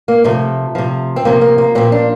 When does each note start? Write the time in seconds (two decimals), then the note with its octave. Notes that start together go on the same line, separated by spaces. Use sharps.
0.08 A#3
0.24 C3 F3 A3
0.75 C3 F3
1.16 C4
1.25 C3 F3 A#3
1.41 A#3
1.58 A#3
1.75 A#2 F3 C4
1.92 D4